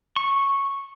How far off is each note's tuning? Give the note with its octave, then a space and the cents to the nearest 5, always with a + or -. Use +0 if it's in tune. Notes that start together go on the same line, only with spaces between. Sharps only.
C#6 -5